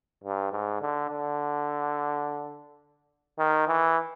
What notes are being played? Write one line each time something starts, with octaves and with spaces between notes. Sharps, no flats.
G2
G#2
D3
D3
D#3
E3